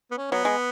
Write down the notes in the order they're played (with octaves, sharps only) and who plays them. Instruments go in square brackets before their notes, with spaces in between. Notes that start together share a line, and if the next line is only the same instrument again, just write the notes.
[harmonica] B3
C#4
[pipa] F#3 [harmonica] B3
[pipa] G#3